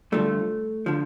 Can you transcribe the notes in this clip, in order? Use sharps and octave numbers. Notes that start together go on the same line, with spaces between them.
G2 D3 F3 A3
D3 F3